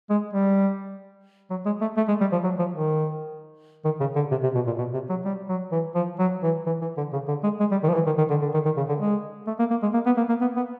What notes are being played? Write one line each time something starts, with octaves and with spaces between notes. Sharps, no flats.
G#3
G3
F#3
G#3
A3
A3
G#3
G3
F3
F#3
F3
D#3
D#3
C#3
D3
C3
C3
B2
A#2
B2
C3
F#3
G3
F#3
E3
F3
F#3
E3
E3
E3
D3
C#3
D3
G#3
G#3
G3
D#3
F3
E3
D#3
D#3
D3
D3
D#3
D#3
C#3
D3
G#3
A3
A#3
A#3
G#3
A#3
B3
A#3
A#3
B3
B3